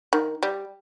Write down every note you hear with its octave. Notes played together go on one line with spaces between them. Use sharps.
D#3
G3